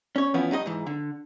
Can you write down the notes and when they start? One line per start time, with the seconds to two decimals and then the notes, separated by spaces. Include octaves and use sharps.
0.16 C#4 C#5
0.34 E3 F3 B3 C#4 E4
0.51 G2 D#4 E4 D#5
0.66 G#2 E3
0.87 D3